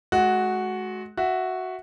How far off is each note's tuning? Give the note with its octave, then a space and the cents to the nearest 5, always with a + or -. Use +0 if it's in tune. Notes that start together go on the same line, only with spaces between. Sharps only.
G#3 +40 F#4 +0
F#4 +0 E5 +0